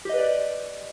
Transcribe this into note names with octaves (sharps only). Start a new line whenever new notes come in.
G4 B4 D5 D#5